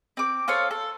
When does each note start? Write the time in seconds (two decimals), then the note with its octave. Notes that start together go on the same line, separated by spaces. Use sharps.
0.17 C4 D6
0.48 F4 A4 C5 C#5
0.71 A4